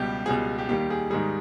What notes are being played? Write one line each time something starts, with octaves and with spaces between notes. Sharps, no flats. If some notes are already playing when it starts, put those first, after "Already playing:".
Already playing: C#2 B2 G3 G4
C#2 B2 G3 G#4
G4
D#2 D#3 G3 G4
G#4
G#2 D#3 G3 G#4